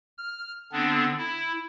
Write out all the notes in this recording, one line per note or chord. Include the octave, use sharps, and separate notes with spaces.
F6
D3 B3 C4 D4
E4